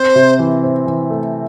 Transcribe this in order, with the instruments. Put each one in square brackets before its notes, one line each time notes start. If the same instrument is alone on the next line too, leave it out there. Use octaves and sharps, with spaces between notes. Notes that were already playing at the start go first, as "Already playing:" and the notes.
Already playing: [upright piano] C4 [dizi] C5
[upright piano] C3
E3
C4
E3
A3